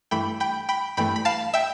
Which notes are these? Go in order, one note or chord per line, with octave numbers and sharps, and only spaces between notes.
G2 E3 A3 G5 B5
G5 B5
G5 B5
G2 E3 A3 G5 B5
B5
F5 A5
E5 G5